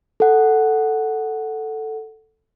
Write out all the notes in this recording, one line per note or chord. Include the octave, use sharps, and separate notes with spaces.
A4 F#5